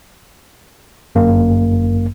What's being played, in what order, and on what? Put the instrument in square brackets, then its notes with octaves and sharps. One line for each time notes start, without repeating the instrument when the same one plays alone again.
[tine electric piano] G1 F#2 A#3